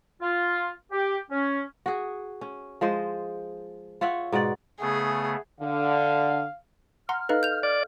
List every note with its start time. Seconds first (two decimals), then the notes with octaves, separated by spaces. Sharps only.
0.21 F4
0.92 G4
1.31 C#4
1.86 F#4 G#4
2.41 C#4
2.81 F3 G#3 C5 D#5
4.01 F4 C#5 E5 F#5
4.32 G#2 B2 F#4 D5
4.81 C#3 A3 B3 G#4
5.61 D3 F5
7.09 F#5 A#5 C6 F6
7.29 D#4 A4 B4 D#5 F5
7.43 G6 F7
7.63 D5